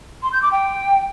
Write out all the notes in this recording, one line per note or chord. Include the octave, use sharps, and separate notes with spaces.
C6
G6
D6
G5